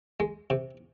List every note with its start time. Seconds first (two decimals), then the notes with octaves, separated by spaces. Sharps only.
0.20 G#3
0.50 C3